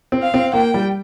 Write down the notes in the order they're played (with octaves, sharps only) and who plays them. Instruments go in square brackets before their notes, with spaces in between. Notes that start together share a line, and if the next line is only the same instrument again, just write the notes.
[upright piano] C4
[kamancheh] F5
[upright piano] C4
[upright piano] A#3 [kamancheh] G5
[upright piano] G3